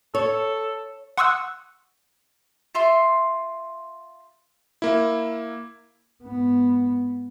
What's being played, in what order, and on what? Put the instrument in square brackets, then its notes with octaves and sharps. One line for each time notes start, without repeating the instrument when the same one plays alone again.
[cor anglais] A4 [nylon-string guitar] C#5
[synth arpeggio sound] F#5 C6 C#6 D#6 E6 F#6
[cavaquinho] F4 E5 C6
[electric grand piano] A#3 E4
[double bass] G#2 B3